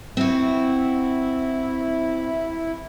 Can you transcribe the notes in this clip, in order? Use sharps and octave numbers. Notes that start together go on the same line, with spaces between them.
C4 E4 F#4